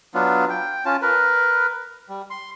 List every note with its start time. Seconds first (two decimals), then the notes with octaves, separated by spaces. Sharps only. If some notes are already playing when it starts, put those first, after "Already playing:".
0.14 F#3 B3 D4 F4
0.50 G5
0.86 C#4 F4 A5
1.02 A#4 B4
2.09 G3
2.30 C6